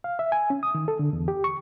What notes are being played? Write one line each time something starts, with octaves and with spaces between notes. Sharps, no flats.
F5
E5
G#5
C#4
D#6
D#3
A4
D3
E2
G4
C#6